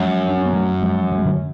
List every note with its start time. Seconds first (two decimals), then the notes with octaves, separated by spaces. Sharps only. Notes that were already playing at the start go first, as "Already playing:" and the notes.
Already playing: F#2 F3 G#3
0.29 D4
0.37 C#4
0.46 B3
0.53 F#3 A3
0.82 F3 G#3
1.12 F#3
1.18 G#3
1.25 D3 F#3